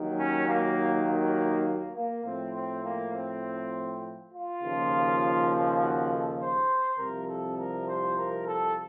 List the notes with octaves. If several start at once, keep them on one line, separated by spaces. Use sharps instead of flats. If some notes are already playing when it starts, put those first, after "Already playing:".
Already playing: D#2 D#3 F#3
C#4
A#3
A#3
A#3
A#3
A2 F3 C4
C4
A#3
C4
F4
D#2 C#3 F3
F#4
A4
C5
C2 C3 F3 A#4
A4
A#4
C5
A#4
A4